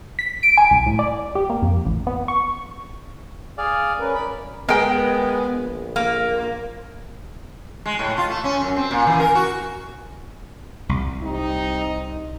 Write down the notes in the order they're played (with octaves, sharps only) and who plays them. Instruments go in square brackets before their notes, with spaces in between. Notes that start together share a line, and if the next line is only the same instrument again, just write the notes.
[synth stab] B6
D7
G#5
C2
A2
D5
G4
A#3
F2
A1
B3
C#6
[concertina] G#4 D5 F5
[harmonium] C#4 A#4 B4
[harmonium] F#2 D5 [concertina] B5
[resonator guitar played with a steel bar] G#3 [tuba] B3 [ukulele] A#4 G5
[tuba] A#1
[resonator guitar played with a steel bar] A#3
[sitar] G#3
A2
F4
A3
C#4
F#2
C4
A#2
E3
A#4
F#4
[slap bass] C2
[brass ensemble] G3 C4 D#4